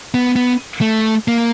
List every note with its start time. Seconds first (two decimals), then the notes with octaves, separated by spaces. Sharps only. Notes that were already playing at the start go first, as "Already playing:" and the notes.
0.14 B3
0.36 B3
0.81 A3
1.28 A#3